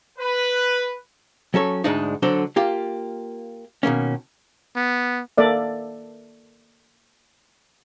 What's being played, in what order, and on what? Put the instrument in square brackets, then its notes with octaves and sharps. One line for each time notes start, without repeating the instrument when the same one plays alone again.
[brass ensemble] B4
[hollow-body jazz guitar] F#3 C#4 A4 C#5
D2 G#2 G#3 D4 D#4
D3 F#3 D4 A4 C5
A#3 F4 G4
B2 D#3 A#3 C#4
[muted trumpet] B3
[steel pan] A#3 A4 D5 E5